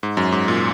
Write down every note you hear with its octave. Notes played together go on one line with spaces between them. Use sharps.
G#2
F#2
G#2
A#2